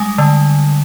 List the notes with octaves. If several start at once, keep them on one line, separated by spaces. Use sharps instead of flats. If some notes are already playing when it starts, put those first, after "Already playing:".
Already playing: G3 G#3 G#5
D3